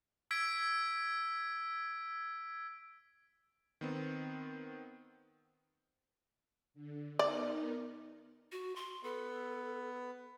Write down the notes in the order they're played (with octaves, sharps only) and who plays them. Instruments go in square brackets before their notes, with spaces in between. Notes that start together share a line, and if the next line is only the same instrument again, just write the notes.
[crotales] E6 G#6 B6 D7
[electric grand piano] D#3 B3 C4
[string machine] D3
[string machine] B3 D#4 A#4 [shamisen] D5
[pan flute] F#4
C6
[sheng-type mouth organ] B3 [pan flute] A4